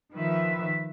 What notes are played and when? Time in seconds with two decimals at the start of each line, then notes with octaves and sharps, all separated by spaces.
0.13 D#3 F3 B4 E5